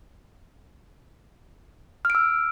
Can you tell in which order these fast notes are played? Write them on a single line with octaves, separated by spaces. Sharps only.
F6 D7 E6